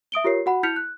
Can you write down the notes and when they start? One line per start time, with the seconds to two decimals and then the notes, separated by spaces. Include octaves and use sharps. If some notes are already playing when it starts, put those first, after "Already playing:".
0.12 E5 D#6 D7 G7
0.24 F4 G4 A#4 C#5 C7
0.46 F#4 F#5 B5
0.63 E4 F6 G6 B6 C#7 F7
0.76 F#6